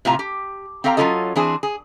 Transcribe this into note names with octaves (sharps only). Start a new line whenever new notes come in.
A2 C3 F4 A#5
G4
C4 G4 A4 F5 A#5
F#3 A#3 C#4 F4 A4 D#5
E3 C4 D4 G#4 C5
G#4